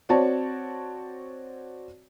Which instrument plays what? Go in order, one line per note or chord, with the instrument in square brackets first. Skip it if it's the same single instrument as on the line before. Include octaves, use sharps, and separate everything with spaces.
[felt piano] C4 F#4 C#5 D5 A5